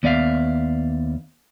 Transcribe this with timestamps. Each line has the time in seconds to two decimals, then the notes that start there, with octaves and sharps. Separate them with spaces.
0.03 D#2 B3 D5 E5 F5